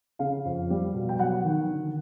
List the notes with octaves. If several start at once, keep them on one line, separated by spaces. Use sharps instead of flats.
C#3 F5
F2
G3
B2
G5
F#3 F#5
D#3
D3